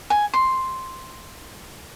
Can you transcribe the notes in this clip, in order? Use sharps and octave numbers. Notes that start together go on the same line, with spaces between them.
G#5
C6